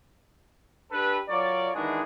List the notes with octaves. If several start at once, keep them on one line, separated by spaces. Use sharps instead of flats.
D4 G4 A4 B4
F#3 F4 A#4 C#5 D5
D#3 E3 G#3 D4 F#4 G#4